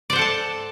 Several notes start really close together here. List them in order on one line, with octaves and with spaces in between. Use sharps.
D5 C5 F#5 A4 A5